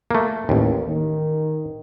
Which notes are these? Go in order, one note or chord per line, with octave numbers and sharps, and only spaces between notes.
A3 A#3
A1 D#2 A#3
D#3